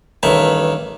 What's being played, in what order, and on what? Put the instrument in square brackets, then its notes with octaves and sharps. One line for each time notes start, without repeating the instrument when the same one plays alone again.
[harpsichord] A1 G2 D#3 E5